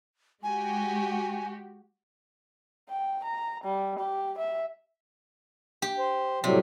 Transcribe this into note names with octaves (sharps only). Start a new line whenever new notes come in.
G#3 F#4 G4 G#5
G5
A#5
G3
G4
E5
G4
C5
A2 C3 F#3 G3